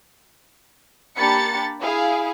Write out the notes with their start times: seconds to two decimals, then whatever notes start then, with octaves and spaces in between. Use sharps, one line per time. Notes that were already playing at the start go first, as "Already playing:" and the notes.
1.15 A#3 D4 G4 B5 A6 C#7
1.80 E4 G#4 F5